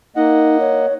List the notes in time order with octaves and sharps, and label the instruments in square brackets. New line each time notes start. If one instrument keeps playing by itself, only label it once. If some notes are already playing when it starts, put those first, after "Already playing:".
[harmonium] A#3 D#5 F#5 [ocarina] D#4
[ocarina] C#5